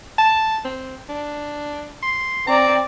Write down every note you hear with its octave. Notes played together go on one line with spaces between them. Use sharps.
A5
C4
D4
C6
C4 D5 A#5